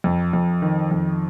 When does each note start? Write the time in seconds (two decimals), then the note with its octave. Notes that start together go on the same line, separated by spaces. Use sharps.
0.04 F2
0.33 F2
0.62 D#3
0.91 F2